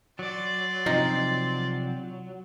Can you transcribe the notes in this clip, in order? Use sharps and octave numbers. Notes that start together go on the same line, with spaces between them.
F#3 D5 C6
C3 F3 D#4